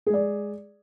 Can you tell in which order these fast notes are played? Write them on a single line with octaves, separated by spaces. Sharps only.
G#4 G#3 D5